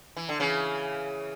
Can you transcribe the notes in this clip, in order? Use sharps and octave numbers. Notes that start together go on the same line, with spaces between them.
E3
D3
C#3 E3